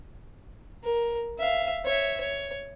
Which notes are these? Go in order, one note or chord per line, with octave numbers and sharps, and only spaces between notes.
A#4
E5 F5
C#5 E5
C#5